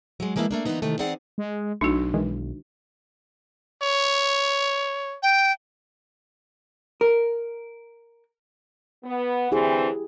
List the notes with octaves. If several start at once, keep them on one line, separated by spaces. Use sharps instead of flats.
F#3 G#3
E3 G#3 A#3 B3 E4 A5
A3 A#3 D4
D3 E3 G#3 A#3 B3 D#4
C3 D#3 E3 A3
E3 C4 D#4 G#4 D5 F#5
G#3
B1 A3 D4 D#4 F#4
D#3 E3 G#3
C#5
G5
A#4
B3
D3 E3 C4 E4 G4 G#4